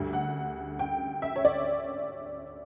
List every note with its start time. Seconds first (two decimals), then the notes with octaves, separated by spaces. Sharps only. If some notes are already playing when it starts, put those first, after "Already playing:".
Already playing: D2 D3 G3
0.13 F#5
0.79 G5
1.22 E5
1.36 C#5
1.45 D5